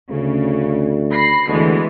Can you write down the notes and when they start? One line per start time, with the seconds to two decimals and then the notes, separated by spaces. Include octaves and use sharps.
0.10 D2 C#3
1.12 B5 A#6 C7
1.48 D2 B2 E3 G#3